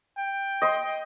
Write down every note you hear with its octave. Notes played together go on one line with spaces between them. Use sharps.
G5
D#5 C6